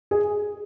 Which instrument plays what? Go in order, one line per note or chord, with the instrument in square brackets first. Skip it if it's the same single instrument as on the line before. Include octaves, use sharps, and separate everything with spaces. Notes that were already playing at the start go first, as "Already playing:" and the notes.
[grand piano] G#4